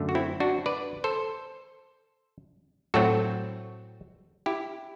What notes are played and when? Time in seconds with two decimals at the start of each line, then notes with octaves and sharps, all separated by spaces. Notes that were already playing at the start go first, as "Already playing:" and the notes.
Already playing: F#2 D3 A3
0.09 F#4
0.15 C4 E4
0.40 D4 F#4
0.66 B4 D5
1.04 A4 C5
2.94 A2 F#3 A3 C4 F#4 A4
4.46 E4 G4